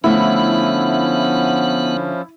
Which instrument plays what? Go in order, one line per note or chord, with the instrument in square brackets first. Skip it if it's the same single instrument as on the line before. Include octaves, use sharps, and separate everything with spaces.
[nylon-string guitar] D3 A3 [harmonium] F3 C#4 [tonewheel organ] B3 F#5 [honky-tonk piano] E4